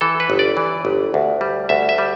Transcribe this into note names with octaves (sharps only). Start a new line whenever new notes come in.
E3 A4
B4
G1
D5
E3
G1
D2
G3
D2 E5
E5
G3